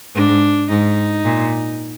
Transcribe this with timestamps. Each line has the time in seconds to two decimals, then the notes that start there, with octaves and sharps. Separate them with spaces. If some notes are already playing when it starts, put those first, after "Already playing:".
0.15 G#2 D4
0.70 G#2 D#4
1.25 A#2